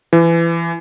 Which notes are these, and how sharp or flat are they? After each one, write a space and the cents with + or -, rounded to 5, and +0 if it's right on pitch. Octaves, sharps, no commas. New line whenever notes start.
E3 +25